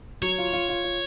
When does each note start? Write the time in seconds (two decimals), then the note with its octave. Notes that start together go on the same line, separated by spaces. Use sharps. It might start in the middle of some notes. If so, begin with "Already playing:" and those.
0.22 F#3 C#5
0.38 F4
0.53 F4
0.69 F4
0.84 F4